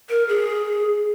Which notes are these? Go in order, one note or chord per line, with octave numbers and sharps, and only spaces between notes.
A#4
G#4